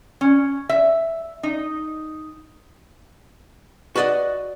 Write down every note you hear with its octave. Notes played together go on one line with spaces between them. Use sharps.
C#4
E5
D#4
F#4 B4 D5 D#5 F#5